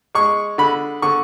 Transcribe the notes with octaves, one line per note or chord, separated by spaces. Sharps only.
G#3 C#6
D3 B5
D3 C#6